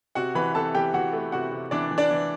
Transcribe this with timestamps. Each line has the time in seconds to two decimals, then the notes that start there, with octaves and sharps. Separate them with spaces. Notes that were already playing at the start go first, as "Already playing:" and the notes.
0.15 C3 F#4 F#5
0.35 E3 B4 B5
0.55 C3 A4 A5
0.75 E3 G4 G5
0.94 E3 F#4 F#5
1.13 A3
1.32 C3 F#4 F#5
1.52 C3
1.71 E3 D4 D5
1.91 E3
1.98 D4 D5
2.10 E3